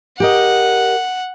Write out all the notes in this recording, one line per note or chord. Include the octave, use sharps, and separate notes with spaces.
G4 A#4 D#5 F#5